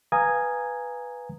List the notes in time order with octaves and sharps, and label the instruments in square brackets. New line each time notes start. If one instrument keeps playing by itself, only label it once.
[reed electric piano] B4 F5 G#5 A#5 D#6 G#6